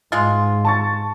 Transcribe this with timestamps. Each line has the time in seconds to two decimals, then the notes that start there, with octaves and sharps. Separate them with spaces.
0.12 G#2 G#3 F4
0.65 A5 C#6 A6